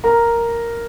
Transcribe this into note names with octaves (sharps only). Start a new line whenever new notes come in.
A#4 A#5